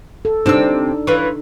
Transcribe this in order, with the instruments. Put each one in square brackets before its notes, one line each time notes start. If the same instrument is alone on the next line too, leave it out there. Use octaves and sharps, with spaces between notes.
[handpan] A4
[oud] C3 C4 [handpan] D4 D#4 [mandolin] A5 E6
[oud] E3 [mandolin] F4 B4 C#5